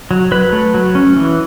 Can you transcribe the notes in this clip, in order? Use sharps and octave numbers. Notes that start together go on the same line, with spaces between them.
F#3
F#3 B4
A3
F#3
C#4
E3